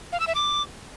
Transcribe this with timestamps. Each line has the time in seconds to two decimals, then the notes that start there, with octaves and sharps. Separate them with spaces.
0.12 F5
0.20 E6
0.27 E5
0.35 D6